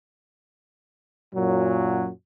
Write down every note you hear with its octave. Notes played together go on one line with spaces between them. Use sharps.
F#2 A#2 F#3